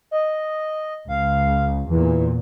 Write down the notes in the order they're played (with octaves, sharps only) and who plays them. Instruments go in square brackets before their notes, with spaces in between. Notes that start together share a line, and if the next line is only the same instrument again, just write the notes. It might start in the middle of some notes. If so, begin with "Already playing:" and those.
[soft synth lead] D#5
[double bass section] C#2 [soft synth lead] F5
[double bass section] E2 A#2 [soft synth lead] E3